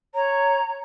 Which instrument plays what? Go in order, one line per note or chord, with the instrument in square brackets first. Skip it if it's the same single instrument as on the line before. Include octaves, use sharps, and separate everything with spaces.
[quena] C#5 [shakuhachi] A#5